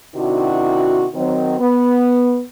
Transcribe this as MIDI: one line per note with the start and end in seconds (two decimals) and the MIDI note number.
0.15 1.05 48
0.15 1.05 51
0.15 1.05 62
0.15 1.05 64
0.15 1.05 66
1.14 1.55 51
1.14 1.55 54
1.14 1.55 60
1.59 2.41 59